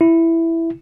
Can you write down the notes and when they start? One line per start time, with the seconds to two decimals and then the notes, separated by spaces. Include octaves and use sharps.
0.01 E4